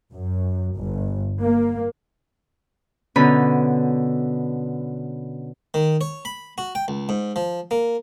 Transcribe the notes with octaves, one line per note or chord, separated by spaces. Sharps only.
F#2
G1
A#3
B2 D3 C#4 B5
D#3
C#5
B5
F#4
G5
C#2
G#2
F3
A#3